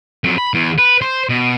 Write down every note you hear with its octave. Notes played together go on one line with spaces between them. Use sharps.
F2 F#3
B5
E2
B4
C5
B2